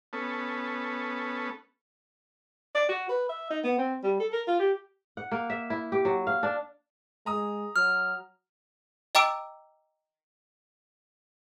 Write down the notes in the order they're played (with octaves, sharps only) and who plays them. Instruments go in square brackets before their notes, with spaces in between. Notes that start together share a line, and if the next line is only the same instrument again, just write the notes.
[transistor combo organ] B3 C#4 A4
[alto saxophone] D5
F#4
B4
E5
D#4
B3
C4
G3
A4
A#4
F4
G4
[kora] F#5
A#3
E5
E4
G4
F#3
F5
D4
[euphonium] G#3 [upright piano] A#5 D#6
[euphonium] F#3 [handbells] F6
[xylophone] D#5 G5 A#5 D6 E6 D7